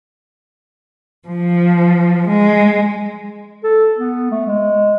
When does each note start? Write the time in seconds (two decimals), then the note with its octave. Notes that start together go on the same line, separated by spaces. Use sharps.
1.28 F3
2.27 G#3
3.63 A4
3.97 B3
4.31 A3
4.47 G#3